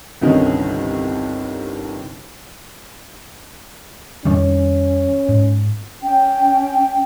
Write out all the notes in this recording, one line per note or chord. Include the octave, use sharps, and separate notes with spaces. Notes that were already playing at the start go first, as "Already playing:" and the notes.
G1 C2 D3 D#3 C#4 D#5
F2 D#3 G3 C#4
G#2
C#4 G5